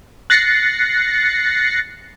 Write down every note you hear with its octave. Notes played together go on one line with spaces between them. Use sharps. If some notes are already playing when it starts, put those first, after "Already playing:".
F#6 A6 A#6 C7 C#7